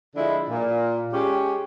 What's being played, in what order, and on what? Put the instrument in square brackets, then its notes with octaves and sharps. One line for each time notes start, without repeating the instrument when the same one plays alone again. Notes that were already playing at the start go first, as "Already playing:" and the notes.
[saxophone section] D3 F3 G#3 D4 E4
A#2
G#3 C#4 G4